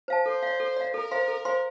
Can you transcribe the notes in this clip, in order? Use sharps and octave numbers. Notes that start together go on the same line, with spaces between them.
C5 F5 A5
A4 C5
D5 F5
A4
D5 F5
A4 A#4
C5 F5 C6
A4
C5 F5 C6